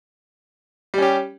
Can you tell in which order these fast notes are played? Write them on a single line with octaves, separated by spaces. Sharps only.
G3 C#4 G4